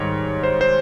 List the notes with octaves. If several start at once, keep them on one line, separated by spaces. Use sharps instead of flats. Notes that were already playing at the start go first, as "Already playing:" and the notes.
Already playing: G#2 D#3 G3 C#5
C5
C5